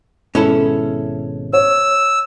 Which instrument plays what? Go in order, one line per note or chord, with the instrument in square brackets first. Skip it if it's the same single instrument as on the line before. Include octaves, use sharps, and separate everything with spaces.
[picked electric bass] G#1 B2 G#3 [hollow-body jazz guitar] C#4 E4 A4
[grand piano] C#5 [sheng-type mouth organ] E6